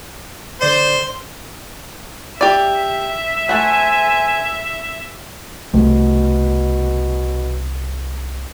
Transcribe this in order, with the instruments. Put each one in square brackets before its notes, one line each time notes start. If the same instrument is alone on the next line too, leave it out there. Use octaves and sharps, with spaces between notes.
[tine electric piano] D3 D5 C7 [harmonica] C5
[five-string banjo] G4 D5 [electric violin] E5
[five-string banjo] A3 F#5 [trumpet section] C5 G#5
[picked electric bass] C2 [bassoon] B2 [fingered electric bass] A3